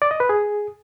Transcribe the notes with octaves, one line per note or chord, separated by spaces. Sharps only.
D5
D#5
B4
G#4